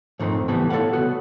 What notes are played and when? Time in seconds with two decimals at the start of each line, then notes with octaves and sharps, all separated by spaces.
0.19 F2 G#2 D#3 A3 C4
0.48 A2 C#3 E3 G3 B3
0.70 A4 C#5 D5 F5 F#5
0.93 C2 B3 F#4